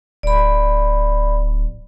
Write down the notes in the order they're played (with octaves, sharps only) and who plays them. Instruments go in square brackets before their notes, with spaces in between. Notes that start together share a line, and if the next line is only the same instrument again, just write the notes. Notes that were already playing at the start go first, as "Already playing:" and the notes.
[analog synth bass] D1 [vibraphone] D5 B5